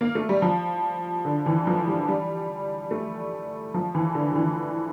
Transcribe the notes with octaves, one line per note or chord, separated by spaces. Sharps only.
A#3
A3
G3
F3
D3
E3
F3
G3
G3
A3
F3
E3
D3
D3
E3